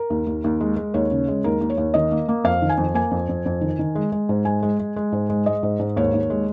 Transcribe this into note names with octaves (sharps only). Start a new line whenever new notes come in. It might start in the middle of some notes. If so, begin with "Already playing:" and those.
Already playing: A#4
D#2
D#2
D#2
G#3
G#3
D#2 C#5
C#3
G#3
D#2 A#4
D#2
C#5
D#2
D#3 D#5
A#3
A#3
F2 F5
D#3
G#5
F2
A#3 G#5
F2
F2
F2
D#3
D#3
G#3
G#3
G#2
G#3 G#5
G#3
G#3
G#3
G#2
G#3
G#3 D#5
G#2
G#2
D#2 C#5
D#2
G#3